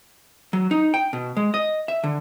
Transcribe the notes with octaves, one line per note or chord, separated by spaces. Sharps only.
F#3
D#4
G5
B2
G#3
D#5
E5
D3